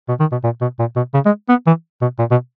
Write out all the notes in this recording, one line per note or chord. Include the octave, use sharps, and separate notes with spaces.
B2
D#3
B2
A#2
B2
A#2
B2
C#3
G#3
B3
E3
B2
A#2
B2